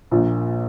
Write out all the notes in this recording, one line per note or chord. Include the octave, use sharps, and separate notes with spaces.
A#1 A#2